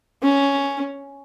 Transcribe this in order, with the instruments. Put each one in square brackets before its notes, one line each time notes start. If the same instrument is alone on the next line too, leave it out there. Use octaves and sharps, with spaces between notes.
[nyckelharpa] C#4